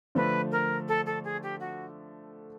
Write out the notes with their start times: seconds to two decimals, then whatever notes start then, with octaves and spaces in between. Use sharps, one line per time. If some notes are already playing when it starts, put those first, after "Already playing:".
0.15 D3 F3 A3 B4
0.51 A#4
0.88 A4
1.06 A4
1.24 G#4
1.43 G4
1.60 F#4